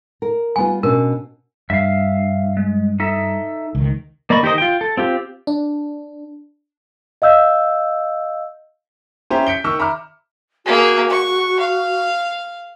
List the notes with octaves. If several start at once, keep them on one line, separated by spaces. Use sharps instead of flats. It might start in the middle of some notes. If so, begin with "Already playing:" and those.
A#4
G3 B3 F4 G#5
B2 C#4 D4 A#4
G2 E5 F5
G#3
D#4 A4 E5
C#2 D#3
A#3 D5 D#5 B5 C#6
D#3 G4 A#4 C5 D#5
F4 G5
A4
C4 F4 G4
D4
D#5 F5 E6 G6
C#4 E4 G4 C5 A#5
G6 B6 C#7 D7 G7
D#3 C#6 E6
E5 A#5 B5 D6 F6
A#3 F#4 G#4
C#6
F5